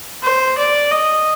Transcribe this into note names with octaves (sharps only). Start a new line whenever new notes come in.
C5
D5
D#5